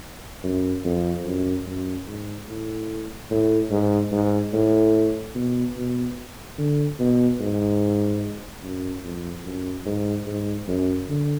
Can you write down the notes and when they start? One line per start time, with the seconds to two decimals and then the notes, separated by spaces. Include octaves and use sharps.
0.44 F#2
0.85 F2
1.25 F#2
1.66 F#2
2.08 G#2
2.49 A2
3.31 A2
3.71 G#2
4.12 G#2
4.53 A2
5.35 B2
5.76 B2
6.58 D3
6.99 B2
7.40 G#2
8.64 F#2
9.04 F2
9.46 F#2
9.86 G#2
10.27 G#2
10.68 F#2
11.09 D3